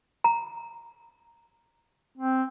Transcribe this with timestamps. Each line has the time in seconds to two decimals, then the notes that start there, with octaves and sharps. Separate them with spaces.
0.24 A#5
2.18 C4